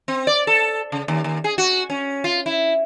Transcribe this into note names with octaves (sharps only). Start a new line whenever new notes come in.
C4
D5
A4
C#3
D#2
D#2
G#4
F#4
C#4
F4
E4